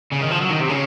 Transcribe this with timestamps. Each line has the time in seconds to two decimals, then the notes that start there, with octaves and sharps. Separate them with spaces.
0.13 C#3
0.22 D#3
0.31 F3
0.41 F#3
0.50 D#3
0.61 C3
0.69 C#3